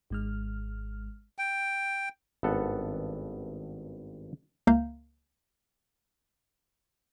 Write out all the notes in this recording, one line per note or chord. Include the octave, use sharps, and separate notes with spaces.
G#1 G#3 F6
G5
G#1 G2 B3 A4 F#5
C#2 A#3 E5 F5 A#5 G6